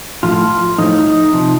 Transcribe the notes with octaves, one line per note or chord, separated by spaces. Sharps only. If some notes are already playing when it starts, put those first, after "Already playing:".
A2 F3 F4
A2 F3 D#4
C3 F3